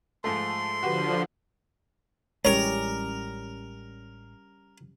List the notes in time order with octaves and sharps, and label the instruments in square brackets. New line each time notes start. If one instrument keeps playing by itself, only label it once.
[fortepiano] G#2 F3 A3 [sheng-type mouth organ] C6
[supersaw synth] D3 F3 [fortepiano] F#4 G4 B4
[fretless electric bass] A1 G#3 [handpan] G3 C#4 G4 [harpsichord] A#4 A#5 [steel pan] C#5